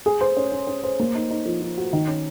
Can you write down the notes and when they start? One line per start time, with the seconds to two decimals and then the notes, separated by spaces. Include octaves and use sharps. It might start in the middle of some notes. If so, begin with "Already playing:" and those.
0.06 G#4
0.21 C5
0.37 C#4
0.52 C#4
0.67 C#4
0.84 C5
1.00 A#3
1.15 D#4
1.31 D#4
1.45 F3
1.61 F3
1.77 F#4
1.93 D#3
2.08 C#4